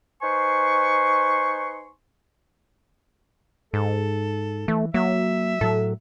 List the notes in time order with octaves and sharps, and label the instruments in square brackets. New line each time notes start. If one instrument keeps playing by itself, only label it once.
[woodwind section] D#4 B4 C5 G#5 C6 C#6
[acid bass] G#2 [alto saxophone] A4
[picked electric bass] E3 [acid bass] A3
[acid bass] F#3 [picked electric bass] A#3 [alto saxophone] E5
[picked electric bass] A2 F#3 [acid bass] A4